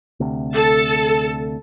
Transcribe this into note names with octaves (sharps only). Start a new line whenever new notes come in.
D2 C3
A4 A5